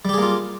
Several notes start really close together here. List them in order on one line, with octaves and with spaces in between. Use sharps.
G3 G4 G#4 A#3 F4